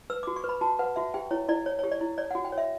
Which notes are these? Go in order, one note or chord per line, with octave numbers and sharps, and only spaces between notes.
B4 E6
F#4 D6
C#6
B4
B5
F#4 A5
B4 F#5
F#4 E5
G4 G5
E4 C#5
E4 D5
C#5
G4 C#5
D5
E4
C#5 D5
F#4 F#5
G5
C#5
E5